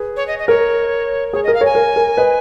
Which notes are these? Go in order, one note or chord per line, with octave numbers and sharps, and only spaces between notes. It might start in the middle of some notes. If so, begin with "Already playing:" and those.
Already playing: G#4 B4
C#5
D#5
D#5
A#4 C#5
G#4 C#5
A#4 D#5
F5
A#4 C#5 G#5
A#4
A#4
B4 D#5